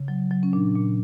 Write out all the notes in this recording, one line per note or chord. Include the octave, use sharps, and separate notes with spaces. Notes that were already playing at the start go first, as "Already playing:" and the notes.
Already playing: C#3
F#3
F#3
C#4
A#2 D4
A#2